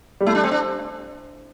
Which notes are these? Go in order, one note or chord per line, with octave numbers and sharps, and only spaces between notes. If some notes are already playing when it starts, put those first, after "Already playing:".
G3
A3 E4
D4
C4
D4